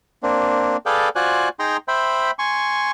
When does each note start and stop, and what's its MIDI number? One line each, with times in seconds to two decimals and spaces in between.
0.23 0.77 58
0.23 0.77 60
0.23 0.77 62
0.86 1.09 68
0.86 1.09 69
0.86 1.09 71
0.86 1.09 74
0.86 1.09 77
0.86 1.09 79
1.16 1.49 65
1.16 1.49 66
1.16 1.49 72
1.16 1.49 74
1.16 1.49 80
1.16 1.49 90
1.59 1.77 63
1.59 1.77 68
1.59 1.77 79
1.59 1.77 82
1.59 1.77 84
1.88 2.31 72
1.88 2.31 76
1.88 2.31 79
1.88 2.31 83
2.39 2.91 80
2.39 2.91 84
2.39 2.91 85